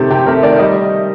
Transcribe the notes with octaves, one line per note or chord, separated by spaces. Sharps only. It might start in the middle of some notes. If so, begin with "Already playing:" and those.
Already playing: C3 D#3 A3 G4
C3 G4
A3 A#4
D#3 D5
G3 D#5